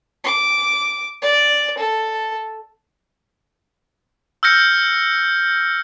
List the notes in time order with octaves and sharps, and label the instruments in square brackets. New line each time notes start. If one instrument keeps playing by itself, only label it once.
[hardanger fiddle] D6
D5
A4
[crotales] E6 F6 G6 A#6 C#7